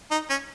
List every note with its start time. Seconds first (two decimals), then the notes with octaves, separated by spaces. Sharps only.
0.11 D#4
0.30 C#4